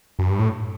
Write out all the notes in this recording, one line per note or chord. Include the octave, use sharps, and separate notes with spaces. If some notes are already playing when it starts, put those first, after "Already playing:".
F#2
G2
A2